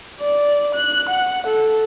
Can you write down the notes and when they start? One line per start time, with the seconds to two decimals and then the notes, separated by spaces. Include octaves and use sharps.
0.20 D5
0.75 F#6
1.09 F#5
1.47 A4